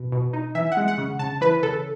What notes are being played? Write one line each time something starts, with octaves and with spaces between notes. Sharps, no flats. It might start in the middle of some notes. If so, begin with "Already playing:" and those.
Already playing: B2
B2
D#4
E3 E5
F#5
G#3
F#5
C#3
C#3 A5
E3 B4
C#3 A4